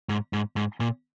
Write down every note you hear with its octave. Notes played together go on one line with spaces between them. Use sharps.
G#2
G#2
G#2
A#2